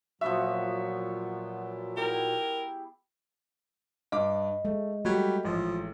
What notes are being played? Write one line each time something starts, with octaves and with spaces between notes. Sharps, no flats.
A#2 F3 F#3 B3 F#4 E5
E4 G4 G#4 A#4
G2 D#5 D6
G#3 A3
F#3 G3 A3 G4
A1 F3